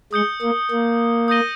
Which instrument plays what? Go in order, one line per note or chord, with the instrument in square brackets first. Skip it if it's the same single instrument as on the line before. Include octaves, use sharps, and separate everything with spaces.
[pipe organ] G#3 [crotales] D#6 G6 C#7 G7
[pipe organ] A#3
A#3
[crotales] D#6 G6 A#6 D#7 G7